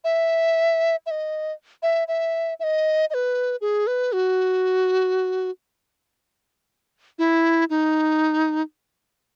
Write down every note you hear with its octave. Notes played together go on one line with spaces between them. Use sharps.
E5
E5
D#5
E5
E5
E5
D#5
D#5
B4
G#4
B4
F#4
E4
D#4